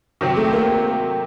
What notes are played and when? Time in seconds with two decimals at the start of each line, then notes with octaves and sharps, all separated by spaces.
0.21 C3 D#3 F#3 C4
0.37 A3
0.53 A#3